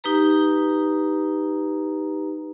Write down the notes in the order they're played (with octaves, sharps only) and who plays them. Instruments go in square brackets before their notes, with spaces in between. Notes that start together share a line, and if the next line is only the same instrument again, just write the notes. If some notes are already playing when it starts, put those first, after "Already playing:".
[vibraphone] D#4 G4 B4 A#5